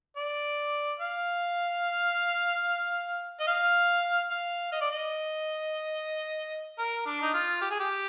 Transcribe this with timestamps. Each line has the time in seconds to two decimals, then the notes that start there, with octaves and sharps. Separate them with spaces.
0.17 D5
0.99 F5
3.40 D#5
3.47 F5
4.30 F5
4.72 D#5
4.81 D5
4.91 D#5
6.79 A#4
7.06 D4
7.22 D#4
7.34 F4
7.61 G4
7.71 G#4
7.80 G4